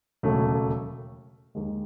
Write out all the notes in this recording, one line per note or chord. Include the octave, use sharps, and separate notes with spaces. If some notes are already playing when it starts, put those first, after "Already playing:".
E1 D#2 C#3 F#3 A3
D#2 D#3 G#3